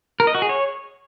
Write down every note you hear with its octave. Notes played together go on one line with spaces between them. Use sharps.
A#4
D#5
F#4
G#4
C#5